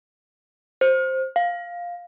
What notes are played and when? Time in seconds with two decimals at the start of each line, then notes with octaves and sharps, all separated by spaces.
0.81 C5
1.36 F5